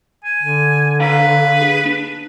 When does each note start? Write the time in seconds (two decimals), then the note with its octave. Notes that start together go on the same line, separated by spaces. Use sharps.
0.25 G#5
0.43 D3
1.00 D4 B4 F5 A#5
1.62 G#4
1.86 D4